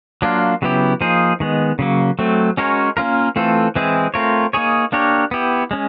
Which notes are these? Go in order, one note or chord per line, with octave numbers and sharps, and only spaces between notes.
F#3 A#3 D4 F4
C#3 F#3 B3 E4 G4
F3 A#3 D#4 G#4 C5
D#3 G#3 B3
C#3 F#3 A#3
F#3 A3 C4
G#3 C#4 F#4 A#4 C#5
A#3 C#4 F4 A#4
E3 A3 C4 F4 A4
E3 G#3 C4 E4 G#4
A3 C4 F4 A#4 C#5
A#3 D#4 G#4 C#5
A#3 D4 G4 A#4 C#5
B3 E4 G4
G#3 C#4